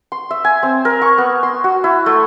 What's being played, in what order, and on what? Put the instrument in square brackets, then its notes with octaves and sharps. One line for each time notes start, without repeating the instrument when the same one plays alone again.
[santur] C6
E5
G#5
C4
A#4
C#6
B3
C6
F#4
E4
A3